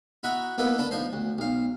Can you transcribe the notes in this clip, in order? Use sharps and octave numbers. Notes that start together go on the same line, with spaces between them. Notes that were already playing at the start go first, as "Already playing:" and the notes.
E4 F#4 D#5 E5 F#5 A#5
A#3 B3 D#4 E4 A4 B4
D3 D4 A4 B4 A5
F3 D#4 C5
D2
B1 F5